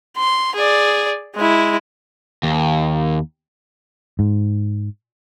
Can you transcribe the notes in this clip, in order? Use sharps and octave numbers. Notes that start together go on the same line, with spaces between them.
C6
G#4 D5
G#3 E4
D#2
G#2